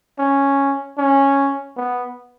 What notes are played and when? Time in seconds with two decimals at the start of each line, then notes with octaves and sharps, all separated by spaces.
0.19 C#4
0.98 C#4
1.77 B3